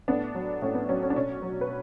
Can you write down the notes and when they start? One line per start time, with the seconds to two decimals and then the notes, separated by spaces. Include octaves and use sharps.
0.08 A2 B3 D4
0.35 F#3
0.62 A2 C#4
0.75 B3
0.89 F#3 C#4
1.03 C#4
1.10 D4
1.15 B2 C#4
1.42 F#3
1.61 B4